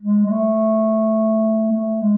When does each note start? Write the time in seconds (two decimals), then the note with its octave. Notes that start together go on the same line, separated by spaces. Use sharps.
0.03 G#3
0.26 G#3
0.31 A3
1.72 A3
2.01 G#3